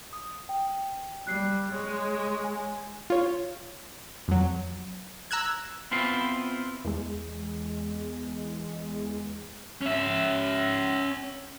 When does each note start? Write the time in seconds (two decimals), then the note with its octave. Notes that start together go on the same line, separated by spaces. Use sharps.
0.13 D#6
0.49 G5
1.27 G3 F#6 C7
1.72 G#3 C#5
2.44 G#5
3.10 F4 C#5
4.28 F2 F#3
5.31 A#5 E6 F#6 G#6
5.91 B3 C4 E4 F4 C5
6.85 E2 G#3
9.81 C#4 E5